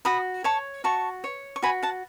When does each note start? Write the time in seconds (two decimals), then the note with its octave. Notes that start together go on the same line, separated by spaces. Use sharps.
0.05 F#4 B5 D#6
0.44 C#5 A5 C#6
0.84 F#4 A5 C#6
1.24 C#5
1.56 C#6
1.63 F#4 G#5 B5
1.82 F#5 A5